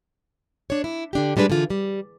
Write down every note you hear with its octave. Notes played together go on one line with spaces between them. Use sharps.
D4 C#5
E4
D3 D4 G4
E3 G3 G#3 D4 B4
D3 E3 F4 G#4
G3